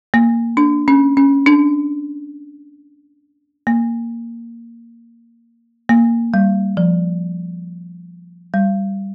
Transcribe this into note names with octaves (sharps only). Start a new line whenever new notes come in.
A#3
D4
C#4
C#4
D4
A#3
A#3
G3
F3
G3